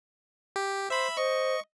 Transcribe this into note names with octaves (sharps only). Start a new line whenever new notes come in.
G4
C5 E5 B5
C5 D#5 C#6